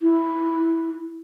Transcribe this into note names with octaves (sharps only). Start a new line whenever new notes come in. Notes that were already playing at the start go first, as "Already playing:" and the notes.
E4